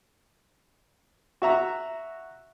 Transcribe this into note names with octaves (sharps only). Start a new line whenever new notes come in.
F#4 E5 A#5